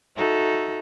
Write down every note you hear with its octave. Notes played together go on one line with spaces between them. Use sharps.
D#4 F#4 A4 E5